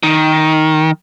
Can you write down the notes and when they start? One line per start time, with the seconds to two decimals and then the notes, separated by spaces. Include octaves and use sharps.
0.03 D#3